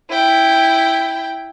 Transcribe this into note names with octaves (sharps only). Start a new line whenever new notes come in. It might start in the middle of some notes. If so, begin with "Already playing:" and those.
E4 G5